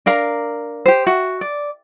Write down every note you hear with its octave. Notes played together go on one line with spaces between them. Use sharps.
D4 A#4 F5 A#5
G4 C5
F#4 E5
D5